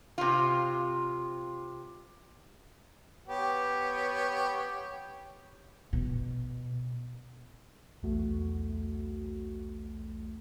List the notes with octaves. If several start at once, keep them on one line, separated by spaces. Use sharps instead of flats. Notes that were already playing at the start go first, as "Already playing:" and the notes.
C3 F4
B3 G4 C#5
B2
B1 E2 A3 F#4